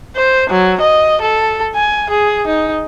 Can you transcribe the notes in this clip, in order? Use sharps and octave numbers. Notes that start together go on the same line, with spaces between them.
C5
F#3
D#5
A4
G#5
G#4
D#4